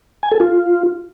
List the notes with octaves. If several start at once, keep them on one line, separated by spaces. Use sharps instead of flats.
G#5
A4
F4